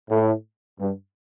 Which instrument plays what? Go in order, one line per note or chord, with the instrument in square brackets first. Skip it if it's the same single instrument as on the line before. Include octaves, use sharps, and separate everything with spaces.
[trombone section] A2
G2